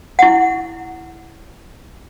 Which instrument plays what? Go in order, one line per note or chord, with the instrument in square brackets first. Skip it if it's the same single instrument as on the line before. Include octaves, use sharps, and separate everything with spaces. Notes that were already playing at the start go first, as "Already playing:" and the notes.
[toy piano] E4 F#5